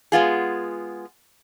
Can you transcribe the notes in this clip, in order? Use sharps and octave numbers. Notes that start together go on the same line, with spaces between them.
G#3 B3 F4 G#4